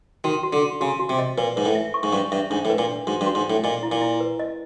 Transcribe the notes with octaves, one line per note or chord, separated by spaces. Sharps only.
D#3 F#4
F#4
D3
F#4
C#3 F#4
F#4
C3
D#5
A#2 B4
G#2 B4
A2
E5
C#6
G#2
G2 C#6
G2 E5
G#2 D4
A2
B4
A#2
D4
G#2 F#4
G2
F#4
G#2
A2 D4
A#2 D#5
E4
A#2
E4
B4
D#5